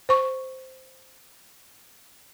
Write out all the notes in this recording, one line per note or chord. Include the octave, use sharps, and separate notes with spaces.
C5 C#6